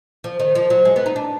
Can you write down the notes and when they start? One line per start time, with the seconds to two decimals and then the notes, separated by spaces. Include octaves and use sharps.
0.24 F3
0.40 D#3
0.55 F3
0.70 F#3
0.85 G#3
0.96 B3
1.06 D#4
1.16 D4